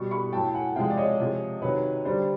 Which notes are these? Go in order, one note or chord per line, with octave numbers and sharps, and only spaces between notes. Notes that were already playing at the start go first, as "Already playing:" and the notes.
Already playing: B2 G3 C#6
B5 C#6
A2 F#3 G5 A5
F#5 G#5
C3 F3 G#3 F5 G5
D5
C#5 D#5
C3 F3 G#3
C3 D#3 F#3 B4 C#5
D3 G3 C5 D5